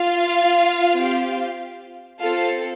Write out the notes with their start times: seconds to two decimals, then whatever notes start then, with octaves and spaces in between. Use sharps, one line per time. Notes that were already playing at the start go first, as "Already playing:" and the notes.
Already playing: F4 F5
0.94 C4 G4
2.21 C4 F4 A4 F5